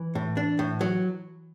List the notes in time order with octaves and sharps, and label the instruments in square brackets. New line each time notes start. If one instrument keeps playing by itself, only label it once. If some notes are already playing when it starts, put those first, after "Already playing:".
Already playing: [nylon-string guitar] E3
[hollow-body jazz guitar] A2
D4
A2
F#3